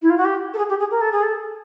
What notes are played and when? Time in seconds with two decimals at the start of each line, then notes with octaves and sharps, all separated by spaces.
0.02 E4
0.10 F4
0.17 F#4
0.24 G4
0.53 A4
0.58 G#4
0.69 G4
0.79 G#4
0.91 A#4
1.01 A4
1.12 G#4
1.23 A4